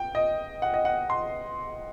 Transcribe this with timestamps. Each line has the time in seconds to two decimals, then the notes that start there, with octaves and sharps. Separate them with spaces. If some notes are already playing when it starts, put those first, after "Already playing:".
Already playing: G5
0.15 D#5
0.62 F#5
0.74 D#5
0.85 F#5
1.10 C6